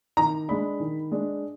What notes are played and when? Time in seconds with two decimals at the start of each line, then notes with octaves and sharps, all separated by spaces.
0.17 D#3 A#5
0.49 G#3 D4 B5
0.80 D#3
1.11 G#3 D4